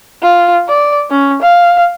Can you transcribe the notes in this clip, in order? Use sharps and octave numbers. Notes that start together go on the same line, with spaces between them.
F4
D5
C#4
F5